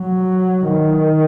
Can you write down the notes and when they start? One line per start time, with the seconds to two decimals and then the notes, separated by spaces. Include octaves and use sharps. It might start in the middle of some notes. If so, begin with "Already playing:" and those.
Already playing: F#3
0.70 D#3